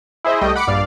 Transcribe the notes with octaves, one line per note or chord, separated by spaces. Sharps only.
E4 G#4 C5 D#5 E5
C2 G3 A3 D#5 G5
F#5 B5 D6 C#7
A#1 G2 D5 F5